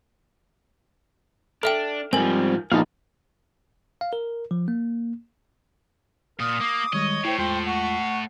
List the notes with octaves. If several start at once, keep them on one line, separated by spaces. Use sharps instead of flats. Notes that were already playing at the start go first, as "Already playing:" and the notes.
D4 A4 E5 G5 F6
G#2 F3 G3 C4 A#4 G#5
A#1 B3 D#4 G#4 F5 A5
F5
A#4
F3
A#3
A#2 A#4 D#6
A#3 D6
D#3 G3 G#3 C#5 D#5
A2 E4 C5 G5
E2 G#3 F4 C5 G5
F#5 C#6